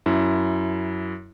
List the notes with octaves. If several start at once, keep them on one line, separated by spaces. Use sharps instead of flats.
F#2 E4